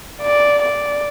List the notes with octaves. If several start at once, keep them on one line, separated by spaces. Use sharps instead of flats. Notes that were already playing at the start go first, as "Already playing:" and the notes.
D5
D5